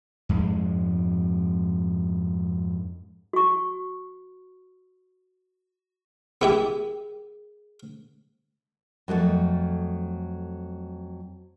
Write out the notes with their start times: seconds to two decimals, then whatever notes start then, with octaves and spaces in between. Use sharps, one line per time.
0.29 F2 G#2 G#3
3.33 F#4 C#6
6.41 B3 E4 G4 G#4 A#4
9.08 F2 F#3 G#3 A3